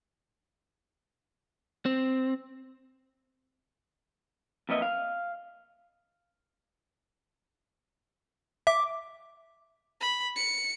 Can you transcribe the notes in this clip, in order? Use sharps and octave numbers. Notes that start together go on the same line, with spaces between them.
C4
F2 A#3 B3 D#5 E5
F5
E5 D6
B5
C#7